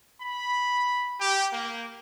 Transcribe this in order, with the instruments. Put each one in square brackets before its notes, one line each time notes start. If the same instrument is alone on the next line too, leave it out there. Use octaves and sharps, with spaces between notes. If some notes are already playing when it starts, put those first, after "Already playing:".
[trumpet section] B5
G4
A#3